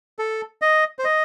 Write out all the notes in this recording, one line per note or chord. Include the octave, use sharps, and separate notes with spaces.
A4
D#5
C5
D#5